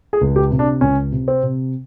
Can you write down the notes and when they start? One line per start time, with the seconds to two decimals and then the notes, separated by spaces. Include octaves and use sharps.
0.13 G#4
0.21 C#2
0.36 G4
0.51 C3
0.59 D4
0.81 C#2 C#4
1.12 C3
1.28 C4
1.43 C3